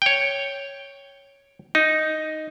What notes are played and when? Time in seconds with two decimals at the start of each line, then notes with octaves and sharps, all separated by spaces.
0.02 C#5 G5
1.75 D#4